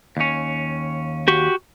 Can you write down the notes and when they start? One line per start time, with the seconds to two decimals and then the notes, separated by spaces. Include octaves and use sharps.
0.17 D#2 C#4
1.28 F#4 G4